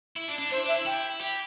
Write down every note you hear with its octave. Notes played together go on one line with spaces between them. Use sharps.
E4
D4
D4
E4 C5
D4
E5
E4
E4 G5
G4